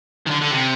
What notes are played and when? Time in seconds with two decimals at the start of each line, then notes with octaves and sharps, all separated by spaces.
0.26 D#3
0.30 D3
0.41 D3
0.51 C3